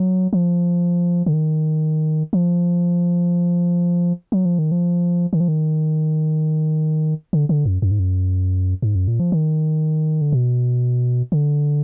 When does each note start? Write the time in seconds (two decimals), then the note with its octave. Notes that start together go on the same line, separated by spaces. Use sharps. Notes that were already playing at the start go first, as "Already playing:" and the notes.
Already playing: F#3
0.33 F3
1.26 D3
1.33 D#3
2.33 F3
4.32 F#3
4.45 F3
4.59 D#3
4.72 F3
5.33 D#3
5.40 F3
5.48 D#3
7.33 D3
7.49 D3
7.66 F#2
7.82 F#2
7.91 G#2
7.99 F#2
8.82 G#2
8.95 F#2
9.08 A#2
9.20 F3
9.32 D#3
10.21 D3
10.32 B2
11.32 D3